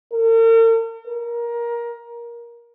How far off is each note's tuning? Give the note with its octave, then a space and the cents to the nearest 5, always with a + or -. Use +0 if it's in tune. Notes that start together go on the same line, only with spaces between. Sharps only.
A#4 -45
A#4 +20